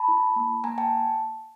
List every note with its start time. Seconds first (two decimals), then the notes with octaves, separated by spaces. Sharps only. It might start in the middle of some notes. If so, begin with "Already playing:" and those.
Already playing: A5 B5
0.08 E4
0.36 A#3
0.64 A#3 G#5 A#5
0.78 G5 A5